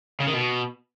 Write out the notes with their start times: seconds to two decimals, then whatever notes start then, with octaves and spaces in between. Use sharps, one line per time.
0.20 C#3
0.27 D#3
0.33 B2